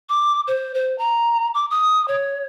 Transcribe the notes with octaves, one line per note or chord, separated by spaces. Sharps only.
D6
C5
C5
A#5
D6
D#6
C#5